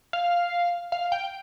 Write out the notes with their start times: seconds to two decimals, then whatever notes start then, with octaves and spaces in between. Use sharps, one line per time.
0.13 F5
0.92 F5
1.12 G5